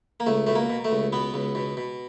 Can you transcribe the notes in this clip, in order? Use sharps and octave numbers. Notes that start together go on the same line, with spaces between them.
A#3
C#2 A3
B2 A3
A#3
B2
A3
C#2
B2 B3
C#2
B2
B2